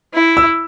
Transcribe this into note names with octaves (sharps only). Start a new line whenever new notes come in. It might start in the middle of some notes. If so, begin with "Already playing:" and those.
E4
E6